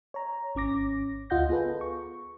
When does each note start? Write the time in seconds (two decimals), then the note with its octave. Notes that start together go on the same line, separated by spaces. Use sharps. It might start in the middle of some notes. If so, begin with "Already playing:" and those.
0.14 C#5 A#5
0.55 G#1 C#4 D6 A#6
1.30 D2 F4 D#5 F#5 G6 A#6
1.49 B3 F4 G#4 A4 B4
1.81 C#6